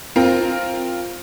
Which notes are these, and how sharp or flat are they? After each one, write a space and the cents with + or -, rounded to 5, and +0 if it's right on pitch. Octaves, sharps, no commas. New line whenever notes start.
C4 +10 F4 +0 A#4 +0